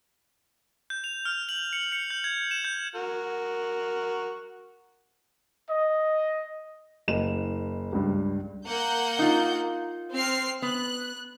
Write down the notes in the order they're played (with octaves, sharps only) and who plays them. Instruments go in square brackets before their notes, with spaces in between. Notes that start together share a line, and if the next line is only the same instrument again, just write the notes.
[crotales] G6
F7
F6
F#7
C#7
C#7
G6
G#6
E7
G6
[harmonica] F#4 A#4
[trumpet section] D#5
[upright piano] F#1 D#5 E7
C#2 G2
[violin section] A#3 F#5 G6
[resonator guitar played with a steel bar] D#4 F4
[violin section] C4 F6 C7
[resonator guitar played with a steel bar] B3 [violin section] F#6